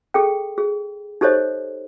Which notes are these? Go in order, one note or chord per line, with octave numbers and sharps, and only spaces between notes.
G#4 A4 G5
G#4
D#4 G4 A4 C5 C#5 D#5